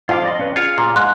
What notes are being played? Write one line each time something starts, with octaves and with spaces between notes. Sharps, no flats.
F2 F4 F5 D6
D5 D#5 C6
C#4 B4
F4 G#4 C#5 F5
A#2
G#2 C6 F#6